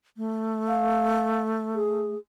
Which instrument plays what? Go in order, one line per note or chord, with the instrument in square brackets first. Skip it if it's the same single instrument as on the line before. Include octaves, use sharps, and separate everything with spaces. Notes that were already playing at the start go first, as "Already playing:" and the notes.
[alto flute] A3
[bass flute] F5
G#4